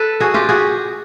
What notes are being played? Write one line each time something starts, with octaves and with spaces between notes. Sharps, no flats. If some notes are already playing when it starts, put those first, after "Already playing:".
Already playing: A4 B4
F#4 G#4
F4 G4
F#4 G#4